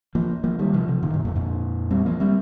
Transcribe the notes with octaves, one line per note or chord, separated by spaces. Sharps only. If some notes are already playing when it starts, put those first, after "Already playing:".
F3 A#3
F3 A#3
D#3 G3
C3 F3
C3 F3
A#2 D#3
G2 C3
F2 A#2
F2 A#2
G3 C4
F3 A#3
G3 C4